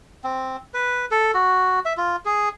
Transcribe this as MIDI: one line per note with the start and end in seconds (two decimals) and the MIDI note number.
0.24 0.57 60
0.74 1.05 71
1.11 1.32 69
1.34 1.79 66
1.85 1.93 76
1.97 2.16 65
2.25 2.49 68